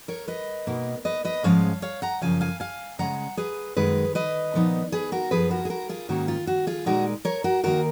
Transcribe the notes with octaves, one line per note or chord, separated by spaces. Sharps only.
A#4 C#5
B4 D#5
B2 A#3 D#4
B4 D#5
B4 D#5
G#2 F3 G#3 C#4 C#5 F5
C#5 F5
F#5 A#5
F#2 C#3 F3 F5 G#5
F5 G#5
F5 G#5
C#3 G#3 C#4 F#5 A#5
G#4 B4
F#2 D#3 G#3 G#4 B4
B4 D#5
A#2 F3 B3 D#4
G#4 B4
F#4 A#4
F#2 F3 B3 G#4 B4
F#4 A#4
G#4
F#4 A#4
F4 G#4
G#2 D#3 A#3 C#4 F#4
F4
F#4
F4 G#4
A#2 G#3 D#4 F#4 A#4
A#4 C#5
F#4 A#4
D#2 D#3 A#3 F#4 A#4